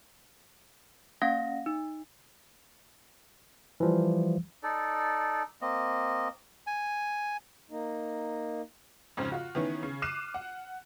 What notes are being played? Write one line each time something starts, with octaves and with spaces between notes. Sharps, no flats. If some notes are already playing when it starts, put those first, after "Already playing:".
A#3 C#4 F5 F#5 A#6
D#4
E3 F3 G3
D#4 A4 D5
A#3 C4 D#5
G#5
A#3 D#4
F2 G#2 C#3 C4
F4 F#4
D#3 E3 B3 C#4
C#3
D6 F6 F#6 C7 D#7 E7
F#5